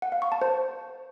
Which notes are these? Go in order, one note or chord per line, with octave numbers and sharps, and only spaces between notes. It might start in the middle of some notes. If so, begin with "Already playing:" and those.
F#5
F5
C#6
A5
C5